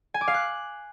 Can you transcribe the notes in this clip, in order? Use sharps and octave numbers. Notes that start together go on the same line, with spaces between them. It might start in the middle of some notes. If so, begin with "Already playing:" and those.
G#5
D6
F5
F#6